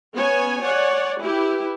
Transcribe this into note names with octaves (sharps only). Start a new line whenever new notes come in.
B3 C#4 C#5 G#5
C#5 D5 F#5 G#5
E4 G4 B4